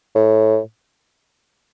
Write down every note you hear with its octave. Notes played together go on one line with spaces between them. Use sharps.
A2